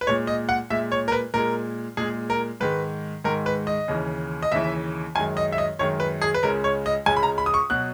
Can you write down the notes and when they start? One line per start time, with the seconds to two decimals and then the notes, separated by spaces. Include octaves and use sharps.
0.01 B4
0.07 A#2 G#3 C#5
0.27 D#5
0.49 F#5
0.70 A#2 G#3 E5
0.92 C#5
1.08 A#4
1.12 B4
1.34 A#2 G#3 A#4
1.97 A#2 G#3 G#4
2.30 A#4
2.60 G#2 D#3 G#3 B4
3.24 G#2 D#3 G#3 A#4
3.46 B4
3.67 D#5
3.88 D#2 C#3 E3
4.43 D#5
4.52 D#2 C#3 E3 E5
5.15 F#2 D#3 G#3 G#5
5.37 D#5
5.52 E5
5.58 D#5
5.79 F#2 D#3 G#3 C#5
6.00 B4
6.22 G#4
6.34 B4
6.43 C#2 C#3 G#3 A#4
6.64 C#5
6.86 D#5
7.06 C#2 C#3 G#3 G#5
7.17 B5
7.23 A#5
7.38 B5
7.46 D#6
7.54 C#6
7.70 B2 F#3 F#6